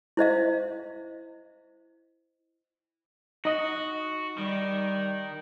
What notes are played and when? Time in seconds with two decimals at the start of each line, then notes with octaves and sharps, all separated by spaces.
0.17 E4 C5 D#5 F5
3.45 D#4 F#4 D#5
4.38 D#3 G3